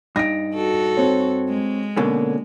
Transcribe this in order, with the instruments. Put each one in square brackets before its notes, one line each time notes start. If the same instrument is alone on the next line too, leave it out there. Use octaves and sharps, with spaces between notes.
[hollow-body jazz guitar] G2 D#4 [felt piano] A#6 D7
[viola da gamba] F#4 A4
[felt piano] C4 C#5
[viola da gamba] G#3
[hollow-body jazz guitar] B2 D3 C#4 [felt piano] A#3